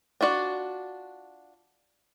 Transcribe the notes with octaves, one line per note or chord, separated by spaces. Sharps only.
D4 F4 F#4 D5